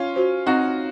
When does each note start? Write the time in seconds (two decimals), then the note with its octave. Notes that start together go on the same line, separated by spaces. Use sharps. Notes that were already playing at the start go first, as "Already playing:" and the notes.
Already playing: C#4 F4
0.16 F#4 C5
0.46 C4 D#4 F#4